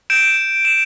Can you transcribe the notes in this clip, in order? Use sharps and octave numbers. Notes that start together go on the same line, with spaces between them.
G6 D7 E7
E7